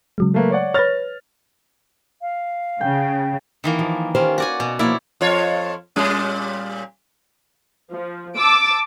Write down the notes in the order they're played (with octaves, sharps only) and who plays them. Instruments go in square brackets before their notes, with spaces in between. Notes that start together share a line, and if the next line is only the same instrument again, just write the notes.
[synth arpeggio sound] C#3 F#3 G#3
[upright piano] A3 A#3 B4
C#5 D5 F#5
[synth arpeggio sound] B4 C#5 [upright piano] F6 A6 A#6
[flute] F5
[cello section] C#3 [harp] G5
[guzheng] D#3 E3 A#3
[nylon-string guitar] F3
[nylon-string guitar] D#3 G4 C5 [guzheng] C#4 F4
[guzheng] F#4 D5 G#5
[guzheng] B2 [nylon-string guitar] G#5
[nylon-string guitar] F3 A#3 [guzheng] E4 C#5 D5
[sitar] F2 F4 C#5
A#2 G3 C#4
[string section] F3
A5 D6 E6